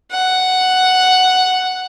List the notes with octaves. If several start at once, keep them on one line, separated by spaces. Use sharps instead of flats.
F#5